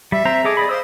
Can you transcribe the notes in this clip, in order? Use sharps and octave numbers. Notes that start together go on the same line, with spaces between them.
G3 E5
C4 C5 A#5
G#4 A4 D#5 D6
D5 D#5 B5
C5 F5 D#6 E6